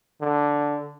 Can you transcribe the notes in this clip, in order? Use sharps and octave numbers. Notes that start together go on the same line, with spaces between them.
D3